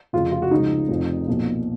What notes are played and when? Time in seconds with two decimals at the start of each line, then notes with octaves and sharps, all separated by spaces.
0.13 F1 F2 C#3 F3 F4
0.32 F4
0.42 F#4
0.51 C#2 C#3 F3 D#4
0.89 F1 F2 F3
1.28 B1 A#2 F3